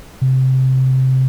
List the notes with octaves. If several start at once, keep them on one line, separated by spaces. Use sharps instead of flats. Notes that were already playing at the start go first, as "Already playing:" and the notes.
C3